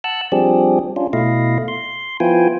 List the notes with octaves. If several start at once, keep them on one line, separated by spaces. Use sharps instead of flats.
F#5 A5 E6 F#6
F3 G3 C4 D4 G4 G#4
C#4 D4 F4
B2 A3 E4 D#5 F5
C6
F3 B3 E4 F4 G5 G#5